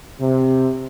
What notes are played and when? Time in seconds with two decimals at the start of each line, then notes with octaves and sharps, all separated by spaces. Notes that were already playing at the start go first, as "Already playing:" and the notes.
0.21 C3